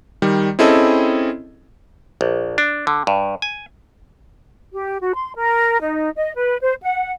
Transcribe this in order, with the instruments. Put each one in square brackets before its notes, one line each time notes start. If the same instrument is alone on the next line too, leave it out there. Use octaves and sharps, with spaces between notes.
[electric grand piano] D#3 G3
C4 C#4 E4 G#4 A4 D#5
[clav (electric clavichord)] A#1
D4
D3
G2
G#5
[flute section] G4
F#4
C6
A#4
D#4
D#5
B4
C5
F#5